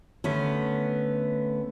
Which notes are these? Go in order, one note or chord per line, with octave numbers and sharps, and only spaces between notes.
D3 A3 B3 C#4